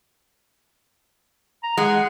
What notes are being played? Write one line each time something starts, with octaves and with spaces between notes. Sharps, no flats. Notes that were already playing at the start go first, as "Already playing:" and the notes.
A#5
G#3 F#5